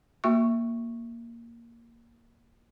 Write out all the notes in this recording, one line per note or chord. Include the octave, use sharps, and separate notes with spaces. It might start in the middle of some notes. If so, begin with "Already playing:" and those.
A#3 F#4 E5 C#6